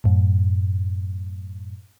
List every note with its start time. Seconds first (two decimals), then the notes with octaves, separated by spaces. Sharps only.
0.04 F#2 A2